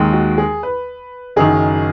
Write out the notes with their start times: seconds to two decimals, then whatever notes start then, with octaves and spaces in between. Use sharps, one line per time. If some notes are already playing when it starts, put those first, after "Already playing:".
Already playing: D#2 D#3 G#3
0.13 F#4
0.38 G#4
0.63 B4
1.36 F#1 F#2 D#3 G#4